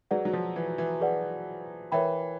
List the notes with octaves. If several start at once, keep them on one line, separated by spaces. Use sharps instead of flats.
F#3 G#4 B4 D5 F#5
F#3
F3
E3
E3
G#4 B4 D5 F#5
E3 A#4 C#5 E5 G5 B5